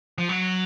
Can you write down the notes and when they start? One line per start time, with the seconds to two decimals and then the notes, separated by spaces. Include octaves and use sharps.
0.18 F3
0.29 F#3